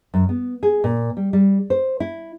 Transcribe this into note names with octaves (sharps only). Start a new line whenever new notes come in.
F#2
B3
G#4
A#2
G3
G3
C5
E4